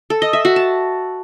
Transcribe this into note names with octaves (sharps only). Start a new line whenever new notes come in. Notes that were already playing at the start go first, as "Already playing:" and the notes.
A4
D#5
E5
F#4
A5